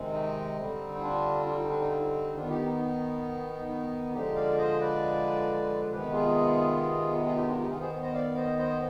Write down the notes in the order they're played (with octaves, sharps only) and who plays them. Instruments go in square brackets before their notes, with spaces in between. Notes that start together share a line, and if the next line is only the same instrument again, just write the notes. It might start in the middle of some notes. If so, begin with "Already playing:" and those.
Already playing: [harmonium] C3 D#3 G#3 C4
D#4
D3 G3 C4
D4 F4
D4 F4
D#4
D4
D#4
F4
D#4
D#3 B3 D4 F4
D#4 G4
D#4
D#4
D#4
D3 F3 G#3 D#4 G4
D5 F5
C5 D#5
B4 D5
C3 D#3 G#3 B3 G4 B4
F4 G#4
F4 G#4
D#4 G4
D4 F4
D#4 G4
D#3 B3 F4 G#4
G#4 C5
C5 D#5
D5 F5
C5 D#5
C5 D#5